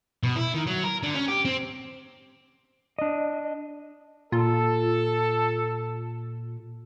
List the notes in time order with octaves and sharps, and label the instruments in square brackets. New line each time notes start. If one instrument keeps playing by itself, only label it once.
[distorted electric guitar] B2
E4
D#3
F#3
A#4
D3
C#4
G4
C4
[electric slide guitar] D4 D#5
[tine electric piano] A#2 [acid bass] F4 [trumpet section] A4